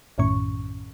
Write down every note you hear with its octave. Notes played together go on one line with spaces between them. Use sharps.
A#1 F#2 A2 D#3 C#4 C#6